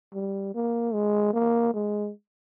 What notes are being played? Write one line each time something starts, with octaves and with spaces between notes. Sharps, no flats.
G3
A#3
G#3
A#3
G#3